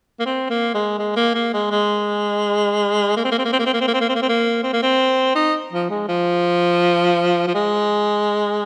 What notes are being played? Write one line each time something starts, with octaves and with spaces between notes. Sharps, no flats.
A#3
C4
A#3
G#3
G#3
A#3
A#3
G#3
G#3
A#3
C4
A#3
C4
A#3
C4
A#3
C4
A#3
C4
A#3
C4
A#3
C4
A#3
C4
A#3
C4
A#3
C4
D#4
F3
G#3
F3
F3
G#3